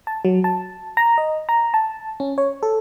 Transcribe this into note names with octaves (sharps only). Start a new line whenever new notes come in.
A5
F#3
A5
A#5
D#5
A#5
A5
C#4
C#5
A4